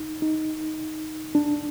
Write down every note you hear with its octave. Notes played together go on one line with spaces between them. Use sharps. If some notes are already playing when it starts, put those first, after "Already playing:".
Already playing: D#4
D#4
D4